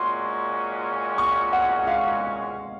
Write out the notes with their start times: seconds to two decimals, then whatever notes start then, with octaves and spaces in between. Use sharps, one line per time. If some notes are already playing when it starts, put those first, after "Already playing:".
Already playing: A#2 G#3 C#4 F#4 C6
1.18 C#6
1.53 F#5
1.79 F#5
1.87 F5